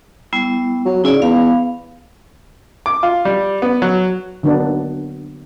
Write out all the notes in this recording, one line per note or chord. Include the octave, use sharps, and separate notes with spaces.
G3 B3 E4
F#3
C#3 D#4 E4 D5
E2 F5 B5
D6
F4
G3
B3
F#3
D3 D#3 F#3 A#3 B3 D4